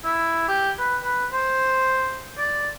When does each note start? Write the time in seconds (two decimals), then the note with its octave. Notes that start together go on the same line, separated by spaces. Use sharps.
0.05 E4
0.48 G4
0.79 B4
1.04 B4
1.32 C5
2.38 D5